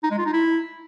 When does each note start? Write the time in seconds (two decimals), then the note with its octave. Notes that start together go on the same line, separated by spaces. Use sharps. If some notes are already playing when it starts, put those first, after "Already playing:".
0.03 D#4
0.11 G#3
0.18 F4
0.26 D#4
0.33 E4